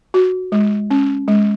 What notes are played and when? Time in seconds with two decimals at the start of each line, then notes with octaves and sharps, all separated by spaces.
0.14 F#4
0.52 G#3
0.91 C#4
1.28 G#3